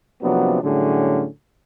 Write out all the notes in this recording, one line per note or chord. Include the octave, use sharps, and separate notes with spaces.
C3 F3 F#3 A#3 B3 D4
A2 D3 F#3 G3 C#4 G#4